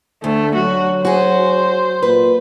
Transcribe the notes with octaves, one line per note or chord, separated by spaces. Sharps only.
D2 D3 A3
F#3 F#4
F#4 G#4 C5
A#2 B4